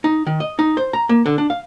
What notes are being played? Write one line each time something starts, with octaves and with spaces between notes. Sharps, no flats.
D#4
D#3
D#5
D#4
C5
A#5
A#3
D3
D4
F5